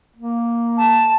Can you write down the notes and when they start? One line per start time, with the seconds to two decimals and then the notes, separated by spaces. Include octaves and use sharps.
0.17 A#3
0.77 A5